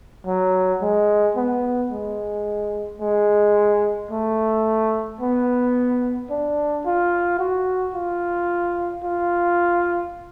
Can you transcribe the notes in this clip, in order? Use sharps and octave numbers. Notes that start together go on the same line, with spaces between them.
F#3
G#3
B3
G#3
G#3
A3
B3
D4
F4
F#4
F4
F4